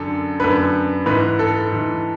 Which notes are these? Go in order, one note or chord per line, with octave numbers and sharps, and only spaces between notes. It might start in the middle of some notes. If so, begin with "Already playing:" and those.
Already playing: F#2 D3 A4
F#2 D3 B4
G#2 E3 B4
A4
G#2 E3